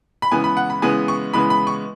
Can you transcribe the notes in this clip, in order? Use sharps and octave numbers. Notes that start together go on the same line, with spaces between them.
B5
C#3 E3 G#3 B3 G#5
B5
F#5
B5
C#3 E3 G#3 B3 G#5
C#6
C#3 E3 G#3 B3 B5
B5
C#6